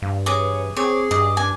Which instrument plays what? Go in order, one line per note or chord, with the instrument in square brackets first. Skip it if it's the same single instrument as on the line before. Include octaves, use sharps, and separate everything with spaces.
[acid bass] G2 [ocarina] F5
[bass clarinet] E3 [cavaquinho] G#4 D6 [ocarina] C#5
[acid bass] C4 [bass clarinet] G#4 [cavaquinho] C#5 [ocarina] D6
[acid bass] G2 [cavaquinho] D#5 [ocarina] D6
[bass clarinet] D4 [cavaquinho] G#5